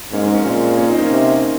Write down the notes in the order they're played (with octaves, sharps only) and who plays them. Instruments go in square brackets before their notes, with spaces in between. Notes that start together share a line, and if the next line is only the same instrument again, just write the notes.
[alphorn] G#2 [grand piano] A#3 C#4
[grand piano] G#3 C4
A#3 C#4
[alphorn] A#2 [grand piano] G#3 C4
[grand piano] A#3 C#4
C4 D#4
A#3 C#4
[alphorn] C3